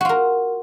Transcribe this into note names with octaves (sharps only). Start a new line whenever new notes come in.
F4 F#4 A#4